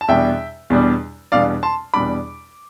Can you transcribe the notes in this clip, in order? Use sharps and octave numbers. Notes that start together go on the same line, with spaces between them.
A5
E2 B2 G3 D4 E5 G5
E2 B2 G3 D4
E2 B2 G3 D4 D5 F5
A5 C6
E2 B2 G3 D4 B5 D6